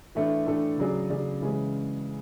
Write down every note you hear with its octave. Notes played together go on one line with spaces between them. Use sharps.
A2 E3 A3 D4 A4
A2 E3 A3 D4 A4
C#3 F#3 C#4 G#4 D5
C#3 F#3 C#4 G#4 D5
C#3 E3 G#3 C#4 G#4